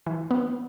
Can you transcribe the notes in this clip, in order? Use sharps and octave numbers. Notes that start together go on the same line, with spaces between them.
E3
B3